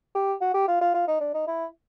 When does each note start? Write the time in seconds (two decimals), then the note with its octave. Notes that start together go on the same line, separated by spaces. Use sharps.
0.15 G4
0.41 F#4
0.54 G4
0.68 F4
0.81 F4
0.94 F4
1.07 D#4
1.21 D4
1.34 D#4
1.47 E4